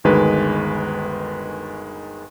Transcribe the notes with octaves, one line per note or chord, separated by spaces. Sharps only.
G1 D2 D#3 G#3 B4